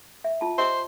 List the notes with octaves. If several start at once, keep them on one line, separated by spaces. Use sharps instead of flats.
E5
F4 A5
G4 C5 D#5 E5